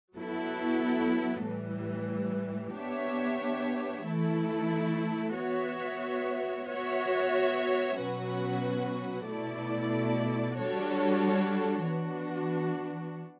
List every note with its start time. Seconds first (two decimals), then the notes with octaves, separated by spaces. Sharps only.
0.16 F#3 B3 E4 A4
1.45 A2 E3 G3
2.76 B3 D4 G4 C#5 E5
4.06 E3 A3 E4 A4
5.36 B3 F#4 C#5 E5
6.67 B3 F#4 C#5 E5
7.96 B2 F#3 C#4 F#4 B4
9.27 B2 A3 E4 A4 D5
10.57 G3 D4 F#4 A4 C#5
11.87 E3 B3 D4 F#4